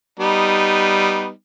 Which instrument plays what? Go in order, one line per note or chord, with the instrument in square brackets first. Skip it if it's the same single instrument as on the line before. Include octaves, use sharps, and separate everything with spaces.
[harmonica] G3 B3 D#4